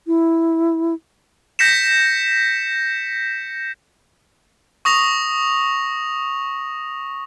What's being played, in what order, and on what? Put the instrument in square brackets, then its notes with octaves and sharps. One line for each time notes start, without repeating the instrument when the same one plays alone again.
[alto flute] E4
[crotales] G6 A#6 B6 C#7 E7
C#6 D#6 A#6 F7